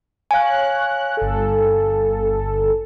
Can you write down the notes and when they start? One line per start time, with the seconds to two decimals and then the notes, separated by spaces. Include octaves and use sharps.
0.31 C#5 F5 G#5 F#6
1.17 G1 A4